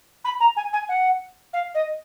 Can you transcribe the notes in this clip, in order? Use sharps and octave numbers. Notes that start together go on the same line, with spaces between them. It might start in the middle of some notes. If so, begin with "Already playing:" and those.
B5
A#5
G#5
G#5
F#5
F5
D#5